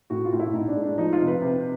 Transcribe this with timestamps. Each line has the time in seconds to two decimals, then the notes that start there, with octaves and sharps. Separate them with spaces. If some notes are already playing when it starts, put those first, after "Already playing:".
0.10 A2 F#4
0.25 F4
0.32 A2
0.40 E4
0.54 A2 D#4
0.68 D4
0.76 G#3
0.84 D4
0.97 F3 D#4
1.13 F4
1.20 C3
1.27 B4
1.41 C3